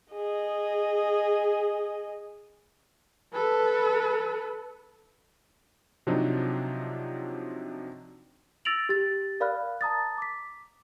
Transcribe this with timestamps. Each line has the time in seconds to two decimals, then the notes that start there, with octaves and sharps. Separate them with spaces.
0.14 G#4 D#5
3.34 A4 B4
6.07 C3 F3 F#3 D4 D#4
8.65 E6 A6 A#6 D7 F7 F#7
8.89 G4 A6
9.40 A#4 D5 F5 B5 F6 F#6
9.81 A5 A#5 D#6 A6
10.18 D6 B6